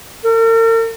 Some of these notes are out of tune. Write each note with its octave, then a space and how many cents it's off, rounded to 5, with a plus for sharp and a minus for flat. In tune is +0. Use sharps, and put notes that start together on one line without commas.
A#4 -45